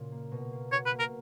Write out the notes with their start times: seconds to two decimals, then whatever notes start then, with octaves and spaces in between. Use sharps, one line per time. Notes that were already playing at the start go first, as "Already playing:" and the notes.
Already playing: A#2 C#3 F#4
0.12 A#3
0.32 B2
0.52 A#3
0.72 F#4 C#5
0.86 B4
0.92 A#3
0.99 A#4